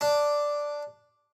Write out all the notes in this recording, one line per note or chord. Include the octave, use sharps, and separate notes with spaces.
D4